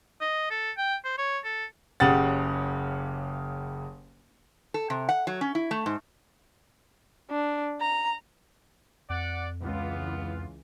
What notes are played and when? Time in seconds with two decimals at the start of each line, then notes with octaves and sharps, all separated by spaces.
0.21 D#5
0.50 A4
0.78 G5
1.05 C5
1.18 C#5
1.44 A4
2.00 F#1 C#3 G4 F#5 A6
4.74 A4
4.90 C3
5.09 F#5
5.27 F#3
5.41 C#4
5.55 E4
5.71 A3
5.86 G#2
7.30 D4
7.81 A#5
9.10 F2 D5 F#5
9.62 C#2 E3 B3 F4